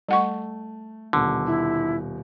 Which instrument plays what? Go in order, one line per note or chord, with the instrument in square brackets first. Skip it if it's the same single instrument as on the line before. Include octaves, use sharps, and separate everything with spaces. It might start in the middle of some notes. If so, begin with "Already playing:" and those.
[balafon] G3 F#5 C#6 [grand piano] A3
[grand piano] D#1 B2 [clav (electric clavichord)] D3
[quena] E4